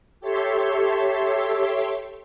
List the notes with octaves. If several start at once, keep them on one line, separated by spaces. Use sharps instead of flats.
G4 A4 C#5 E5 C6